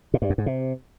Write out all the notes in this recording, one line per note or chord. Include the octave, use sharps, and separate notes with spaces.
A#2
G2
F#2
G#2
C3